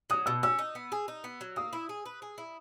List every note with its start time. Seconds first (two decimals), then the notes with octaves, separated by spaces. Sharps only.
0.10 F#3 D#6
0.26 B2 E6
0.43 C#4 E6
0.59 D#4
0.75 B3
0.92 G#4
1.08 D#4
1.24 B3
1.41 F#3
1.56 A#3 D#6
1.73 E4
1.89 G#4
2.06 B4
2.22 G#4
2.38 E4